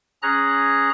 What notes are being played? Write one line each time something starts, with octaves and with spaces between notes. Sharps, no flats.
C#4 G#4 A#5 F#6